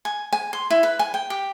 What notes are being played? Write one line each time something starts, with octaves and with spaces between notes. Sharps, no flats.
G#5
G#5
C6
E4
B4
G#5
G5
G4